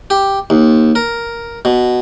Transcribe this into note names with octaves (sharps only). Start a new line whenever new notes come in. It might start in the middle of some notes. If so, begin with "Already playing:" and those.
G4
D#2
A#4
B2